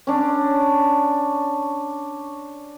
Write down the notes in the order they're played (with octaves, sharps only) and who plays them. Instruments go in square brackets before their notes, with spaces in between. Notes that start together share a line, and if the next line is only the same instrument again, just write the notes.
[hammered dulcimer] C#4 D4